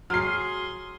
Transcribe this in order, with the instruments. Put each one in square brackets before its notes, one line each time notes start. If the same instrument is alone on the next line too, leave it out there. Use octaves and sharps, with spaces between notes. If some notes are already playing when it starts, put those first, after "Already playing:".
[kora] F#3 [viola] G#4 C6 [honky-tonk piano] F6 C7